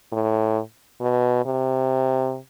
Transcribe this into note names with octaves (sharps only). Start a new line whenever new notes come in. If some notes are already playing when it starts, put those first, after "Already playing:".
A2
B2
C3